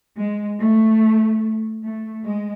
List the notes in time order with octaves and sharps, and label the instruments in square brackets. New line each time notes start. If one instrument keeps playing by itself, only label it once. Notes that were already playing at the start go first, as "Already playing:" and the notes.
[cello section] G#3
A3
A3
G#3